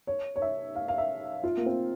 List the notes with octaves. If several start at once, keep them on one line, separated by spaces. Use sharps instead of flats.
C#5
C#5
E5
F5
F5
E5
F4
A#3
C4